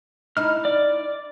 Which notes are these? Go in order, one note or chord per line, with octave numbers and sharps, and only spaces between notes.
D#4 E4 F6
D5